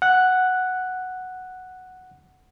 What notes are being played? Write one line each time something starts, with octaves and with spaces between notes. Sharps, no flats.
F#5 F#6